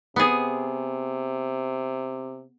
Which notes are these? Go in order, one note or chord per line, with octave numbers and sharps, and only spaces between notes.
C3 B3 G#4